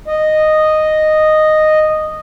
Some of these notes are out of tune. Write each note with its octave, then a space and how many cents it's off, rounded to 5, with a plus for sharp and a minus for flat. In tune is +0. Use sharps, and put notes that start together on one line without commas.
D#5 -5